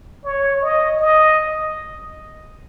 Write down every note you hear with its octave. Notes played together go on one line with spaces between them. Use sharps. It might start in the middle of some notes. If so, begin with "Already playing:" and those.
C#5
D#5
D#5